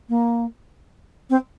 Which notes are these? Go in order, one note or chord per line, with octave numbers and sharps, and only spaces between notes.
A#3
C4